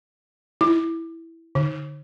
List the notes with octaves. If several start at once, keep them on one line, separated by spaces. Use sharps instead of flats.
E4
D3